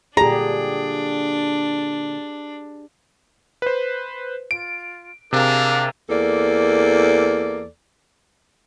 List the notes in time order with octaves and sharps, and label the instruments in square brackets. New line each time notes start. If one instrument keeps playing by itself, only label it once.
[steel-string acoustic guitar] A#2 D3 [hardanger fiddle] D4 [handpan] G4 G#4 [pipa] A#5
[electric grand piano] B4 C5
[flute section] F4 [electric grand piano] D7
[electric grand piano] C3 [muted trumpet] D4 [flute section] G#4 A#4 F5
[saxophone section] E2 A#3 A4 D5